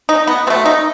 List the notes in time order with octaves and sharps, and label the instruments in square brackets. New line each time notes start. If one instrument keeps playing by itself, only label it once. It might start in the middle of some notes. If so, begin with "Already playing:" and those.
[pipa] D#4
B3
B2 C4
A3
D#4